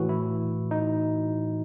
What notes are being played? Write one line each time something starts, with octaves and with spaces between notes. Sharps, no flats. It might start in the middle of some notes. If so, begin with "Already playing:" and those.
Already playing: A2 E3 F#4
E4
D#4